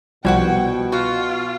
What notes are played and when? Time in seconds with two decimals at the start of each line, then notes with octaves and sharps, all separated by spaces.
0.25 C2 B2 F3 G3 E4 F#4 F#5 G5
0.92 F4 F#4